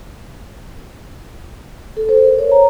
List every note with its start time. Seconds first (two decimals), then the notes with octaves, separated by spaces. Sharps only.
1.97 A4
2.09 C5
2.25 A#4
2.39 C#5
2.52 A#5